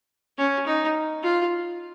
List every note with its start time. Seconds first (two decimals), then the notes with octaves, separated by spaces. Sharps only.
0.38 C#4
0.67 D#4
1.23 F4